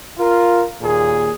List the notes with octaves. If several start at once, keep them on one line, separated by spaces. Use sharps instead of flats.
F4 A#4
D#2 A#2 G#4